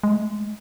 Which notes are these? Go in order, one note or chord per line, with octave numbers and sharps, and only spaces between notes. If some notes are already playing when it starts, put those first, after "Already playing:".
G#3
A3
G#3